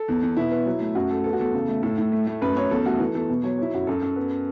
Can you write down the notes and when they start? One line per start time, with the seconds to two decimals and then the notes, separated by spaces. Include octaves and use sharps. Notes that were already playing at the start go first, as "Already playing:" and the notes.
Already playing: A4
0.08 E2
0.22 E2
0.37 B2 E4
0.52 B3
0.66 F#3
0.80 A3
0.95 F#2 F#4
1.10 A3 A4
1.24 B3 A4
1.33 F#4
1.39 E2 A4
1.54 C#3
1.68 A3
1.83 A2 A4
1.98 A2
2.12 A3
2.27 A3
2.41 F#2 B4
2.56 F#2 C#5
2.71 E2 A4
2.85 A3 F#4
3.00 E3 A4
3.14 E2 A4
3.29 B2
3.44 F#3 C#5
3.59 F#3 E4
3.74 F#2 F#4
3.87 F#2 A4
4.02 F#2
4.16 B3